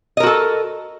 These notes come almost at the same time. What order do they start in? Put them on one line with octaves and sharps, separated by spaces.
D#5 A#4 F#4 A4